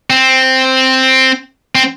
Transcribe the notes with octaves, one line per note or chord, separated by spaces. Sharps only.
C4
C4